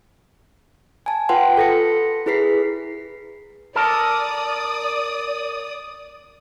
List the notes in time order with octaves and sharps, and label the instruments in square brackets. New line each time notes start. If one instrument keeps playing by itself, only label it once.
[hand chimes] G#5 A5
F4 B4 F#5 G5 C6
A4 A#6 C#7
E4 G#4 B4 B6 C7
[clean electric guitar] A4 A#4 A5 [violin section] D5 D#6